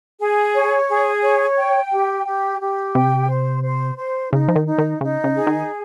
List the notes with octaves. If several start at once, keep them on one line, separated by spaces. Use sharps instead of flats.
G#4
C#5
G#4
C#5
G5
G4
G4
G4
C3 G5
C5
C5
C5
C#3 D#4
F3
D#3
D#4
D#3
C#3 D#4
C#3
G#4
D#3